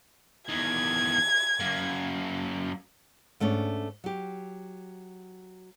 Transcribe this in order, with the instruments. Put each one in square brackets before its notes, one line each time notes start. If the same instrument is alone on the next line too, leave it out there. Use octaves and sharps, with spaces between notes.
[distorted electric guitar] E2 D#3 [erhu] G#6
[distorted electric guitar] F#2 A#3
[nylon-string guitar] G#2 A3 B3 C#4 D4
F#3 G4